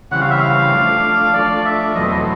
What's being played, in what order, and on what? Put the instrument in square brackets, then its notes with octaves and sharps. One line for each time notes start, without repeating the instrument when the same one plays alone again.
[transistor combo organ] C#3 E3 G3 C4 [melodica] F#5
[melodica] F5
E5
F5
[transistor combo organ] F3 A3 D4
[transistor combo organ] F3 A3 D4 [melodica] D5
[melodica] E5
[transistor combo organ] E2 B2 F#3 A3 C4 [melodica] D#5
[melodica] D#5